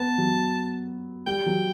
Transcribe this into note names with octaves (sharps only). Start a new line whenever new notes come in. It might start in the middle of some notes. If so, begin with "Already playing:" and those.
Already playing: B3 A5
F#3
G3 G5
F#3